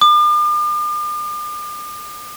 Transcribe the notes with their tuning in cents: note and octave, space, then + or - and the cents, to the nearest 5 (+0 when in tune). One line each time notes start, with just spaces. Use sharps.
D6 +45